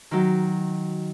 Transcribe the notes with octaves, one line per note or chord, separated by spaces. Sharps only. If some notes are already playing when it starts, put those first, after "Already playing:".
D#3 F#3